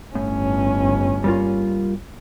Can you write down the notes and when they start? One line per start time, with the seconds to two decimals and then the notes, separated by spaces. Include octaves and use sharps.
0.15 G1 A2 C#4
1.24 G3 A#3 F4